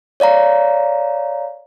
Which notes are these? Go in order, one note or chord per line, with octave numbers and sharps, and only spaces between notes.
C#5 D5 F5 A#5